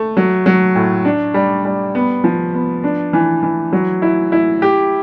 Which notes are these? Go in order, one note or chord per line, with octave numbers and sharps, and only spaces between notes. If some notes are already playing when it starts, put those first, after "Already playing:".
Already playing: A3
F#3
F#3
A2
D4
G3
G3
B3
F3
B3
D4
E3
E3
F#3
E4
E4
G4